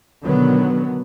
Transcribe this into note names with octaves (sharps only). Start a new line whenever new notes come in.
B2 D3 D#3 F#3 B3